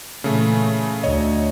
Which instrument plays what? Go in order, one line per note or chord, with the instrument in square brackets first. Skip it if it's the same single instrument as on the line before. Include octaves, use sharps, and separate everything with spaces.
[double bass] A#2 E3 [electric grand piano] C#3 A3
[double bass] D2 [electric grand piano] C#5 D#5